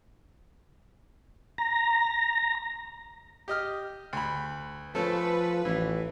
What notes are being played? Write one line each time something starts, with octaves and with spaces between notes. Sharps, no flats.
A#5
G4 D#5 F6
D2 B5
F3 A3 C#4 A4 B4
A1 E3